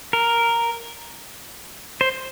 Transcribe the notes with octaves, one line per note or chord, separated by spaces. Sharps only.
A#4
C5